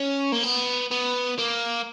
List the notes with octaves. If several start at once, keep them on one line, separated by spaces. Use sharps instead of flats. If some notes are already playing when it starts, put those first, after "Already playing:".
Already playing: C#4
A#3
B3
B3
A#3